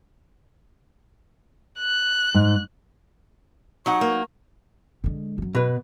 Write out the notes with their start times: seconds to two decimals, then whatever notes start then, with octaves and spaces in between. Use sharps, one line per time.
1.79 F#6
2.34 G#2
3.86 F#3 D#4 F#5 C#6
4.01 A#3
5.04 D3 G#3
5.38 F#2 F#3
5.55 B2 B4